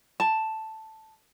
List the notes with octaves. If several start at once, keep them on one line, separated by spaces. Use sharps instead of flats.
A5